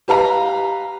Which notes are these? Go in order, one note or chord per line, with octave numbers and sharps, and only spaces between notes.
G4 B4 F5 A#5